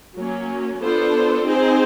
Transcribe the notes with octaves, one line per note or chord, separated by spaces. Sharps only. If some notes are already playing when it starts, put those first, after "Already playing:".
F#3 A#3 C#4
B3 D4 F4 A4 C5
C4 D#4 G#4 C5